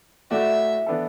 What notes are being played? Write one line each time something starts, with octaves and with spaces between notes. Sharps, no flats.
A2 A3 F#4 D5 E5
E3 B3 D4 A4